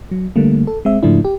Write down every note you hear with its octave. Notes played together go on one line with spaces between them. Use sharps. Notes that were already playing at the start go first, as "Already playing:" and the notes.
F#3
D3 G3 A3 A#3
A4
G#3 C4 E5
G#2 C#3 F3 A3 D4 E4
G4